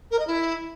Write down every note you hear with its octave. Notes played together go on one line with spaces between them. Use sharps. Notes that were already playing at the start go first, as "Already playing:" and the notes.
A#4
D#5
E4